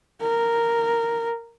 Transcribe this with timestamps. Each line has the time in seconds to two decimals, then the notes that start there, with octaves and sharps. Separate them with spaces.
0.22 A#4